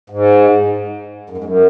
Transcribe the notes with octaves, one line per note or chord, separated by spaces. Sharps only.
G#2
F#2
G#2
F#2